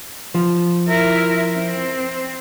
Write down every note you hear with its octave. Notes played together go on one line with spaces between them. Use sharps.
F3
E4 A#4
C4